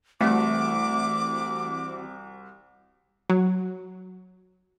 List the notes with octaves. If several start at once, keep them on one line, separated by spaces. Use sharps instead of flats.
C2 E3 A3 C4 F#4 D6
F#3